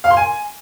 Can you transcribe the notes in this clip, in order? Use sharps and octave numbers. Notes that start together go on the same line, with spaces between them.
F5
C6
G#5